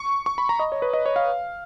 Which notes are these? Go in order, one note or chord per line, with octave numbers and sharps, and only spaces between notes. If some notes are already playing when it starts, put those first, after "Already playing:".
Already playing: C#6
C#6
B5
A#5
D#5
C#5
B4
D#5
C#5
F5